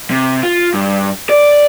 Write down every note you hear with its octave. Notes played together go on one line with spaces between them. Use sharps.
C3
F4
G2
D5